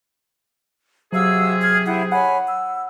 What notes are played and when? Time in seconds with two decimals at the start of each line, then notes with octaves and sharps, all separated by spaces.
1.13 C3 F#3 F#4 G#4 F5 E6
1.61 F6 G#6
1.86 E4 F#5 G5
2.12 C#5 F#5 G#5 B5
2.47 E6